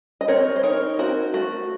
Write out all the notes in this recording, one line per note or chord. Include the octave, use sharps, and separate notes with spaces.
D#5
C4 A#4 C#5
C5
D#4 A#4 C#5
C4 F#4 A#4
A3 F#4